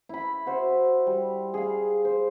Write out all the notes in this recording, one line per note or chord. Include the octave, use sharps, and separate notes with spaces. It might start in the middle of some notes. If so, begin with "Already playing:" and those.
E4 B5
F#4 C5 E5
G3
G#4 F5
C5